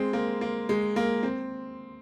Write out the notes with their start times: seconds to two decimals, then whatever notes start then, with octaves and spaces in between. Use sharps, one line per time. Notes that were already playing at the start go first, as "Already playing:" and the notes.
Already playing: G#3 C4
0.13 A#3
0.41 A#3
0.69 G#3
0.96 A#3
1.23 C4